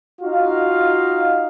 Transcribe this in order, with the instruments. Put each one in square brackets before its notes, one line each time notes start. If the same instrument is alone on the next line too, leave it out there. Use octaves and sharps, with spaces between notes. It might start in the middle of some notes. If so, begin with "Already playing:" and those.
[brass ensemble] D#4 F4 F#4 F5